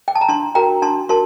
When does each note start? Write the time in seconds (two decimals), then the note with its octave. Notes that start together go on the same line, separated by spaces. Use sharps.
0.08 G5
0.15 A5
0.21 A#5
0.28 D4 A5 C6
0.55 F#4 A#4 G5 A#5
0.82 D4 A5 C6
1.09 F#4 A#4 A5 C6